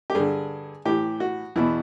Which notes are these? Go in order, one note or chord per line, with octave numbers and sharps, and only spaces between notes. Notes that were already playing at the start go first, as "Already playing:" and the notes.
G4
G2 D3 G#4
A2 E3 G4
F#4
E2 B2 E4